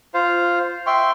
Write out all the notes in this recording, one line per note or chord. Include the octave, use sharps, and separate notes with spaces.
F4 C5 F5
E5 G5 C6 C#6